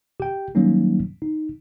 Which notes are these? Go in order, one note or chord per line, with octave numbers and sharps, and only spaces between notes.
G4 G5
D#3 F#3 G3 A#3 C#4 D#4
D#4